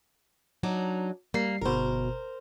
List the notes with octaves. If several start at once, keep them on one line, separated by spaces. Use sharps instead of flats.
F#3 D4 D#4
G3 A#3 C7
G1 B2 A#4 C5